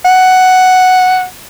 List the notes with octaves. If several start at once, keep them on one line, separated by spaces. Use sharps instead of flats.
F#5